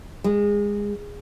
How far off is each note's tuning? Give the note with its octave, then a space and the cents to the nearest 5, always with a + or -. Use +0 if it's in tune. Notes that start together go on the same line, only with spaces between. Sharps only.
G#3 -20